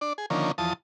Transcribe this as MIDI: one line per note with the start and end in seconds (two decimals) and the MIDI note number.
0.01 0.13 62
0.01 0.13 74
0.18 0.26 68
0.30 0.52 50
0.30 0.52 51
0.30 0.52 53
0.30 0.52 58
0.30 0.52 61
0.58 0.73 40
0.58 0.73 53
0.58 0.73 81
0.58 0.73 87